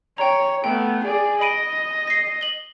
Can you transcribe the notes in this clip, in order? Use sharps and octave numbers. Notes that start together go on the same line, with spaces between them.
C#5 G5 A#5
A3 B3 G5
G#4 D5
D#5 B5 D7 D#7
A#6 C7
F#7 G7